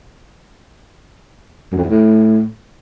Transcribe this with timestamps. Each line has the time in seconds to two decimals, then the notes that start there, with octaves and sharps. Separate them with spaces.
1.72 F#2
1.78 F2
1.84 E2
1.90 A2